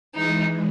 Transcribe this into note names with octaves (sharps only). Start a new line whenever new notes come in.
E3 G#3 D#4